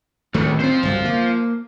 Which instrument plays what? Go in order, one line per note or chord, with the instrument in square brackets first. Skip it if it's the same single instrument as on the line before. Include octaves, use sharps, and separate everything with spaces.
[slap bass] D1 D#3 A3 [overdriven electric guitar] C#2
[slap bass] B3 C4 [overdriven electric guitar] F4 C5
[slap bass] G1 C2 F#3
A#3